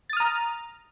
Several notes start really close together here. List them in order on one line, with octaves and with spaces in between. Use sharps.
A6 D#6 F6 A#5